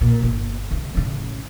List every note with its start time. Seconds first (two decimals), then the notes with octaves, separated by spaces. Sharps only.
0.01 A#2
0.23 G1
0.71 C#3 G3
0.95 A1 C#3